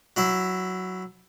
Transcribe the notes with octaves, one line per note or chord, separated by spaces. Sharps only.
F#3 E4 E5